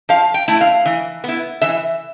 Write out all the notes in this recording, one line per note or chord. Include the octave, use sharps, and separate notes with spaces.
F3 F5
G5
A3 E4
F5
E3
B3 E4
E3 E5